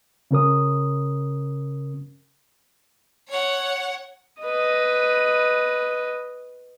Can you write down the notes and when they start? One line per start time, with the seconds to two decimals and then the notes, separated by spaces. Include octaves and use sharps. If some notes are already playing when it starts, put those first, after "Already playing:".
0.31 C#3 C#4 A#4 D#6
3.28 C#5 F#5
4.42 B4 D#5